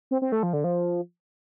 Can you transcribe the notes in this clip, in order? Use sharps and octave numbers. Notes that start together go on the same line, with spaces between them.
C4
C4
A3
F3
D3
F3